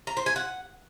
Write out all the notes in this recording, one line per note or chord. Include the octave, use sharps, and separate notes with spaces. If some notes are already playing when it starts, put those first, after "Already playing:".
A#5
C5
G#5
F#5